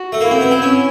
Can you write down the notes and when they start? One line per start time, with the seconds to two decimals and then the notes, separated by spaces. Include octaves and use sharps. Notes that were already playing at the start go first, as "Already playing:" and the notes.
Already playing: F#4
0.12 A3
0.21 A#3 E4
0.31 C4
0.41 B3
0.51 C4
0.62 C#4